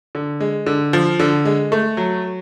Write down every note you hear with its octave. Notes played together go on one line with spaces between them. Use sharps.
D3
G#3
D3
F3
D3
G#3
A3
F#3